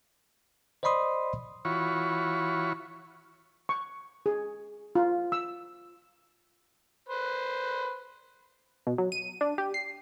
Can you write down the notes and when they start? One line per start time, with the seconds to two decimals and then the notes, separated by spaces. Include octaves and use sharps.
0.83 C5 D5 D#5 B5 C6 D#6
1.65 E3 F4 F#4 C#5 B5 C#6
3.69 C#6
4.26 G#4
4.95 F4
5.32 E6
7.09 B4 C5
8.87 B2
8.98 F#3
9.12 D#7
9.41 D4
9.58 G4
9.74 C7